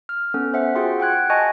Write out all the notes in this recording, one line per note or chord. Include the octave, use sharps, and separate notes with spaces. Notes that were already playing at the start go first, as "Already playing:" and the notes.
F6
B3 C#4 A4
C5 E5 F#5
F4 F#4 G#4 F#5 G5 C6
F#5 G5 F#6 G#6
D#5 G#5 A5 C#6